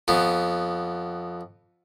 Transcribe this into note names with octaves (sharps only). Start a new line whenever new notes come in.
F2 B3